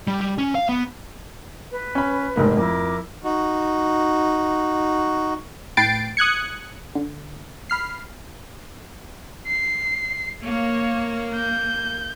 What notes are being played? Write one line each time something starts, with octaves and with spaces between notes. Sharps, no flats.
G3
G3
C#4
F5
B3
B4
C#4 B5
F1 G#2 A#3
F2 E4 A#4 D6
D#4 F#4
A2 B4 G5 A6 C7 D7
D#6 F#6 G#6 C#7
D3
B5 F6 C7
C7
A#3 C#5
G6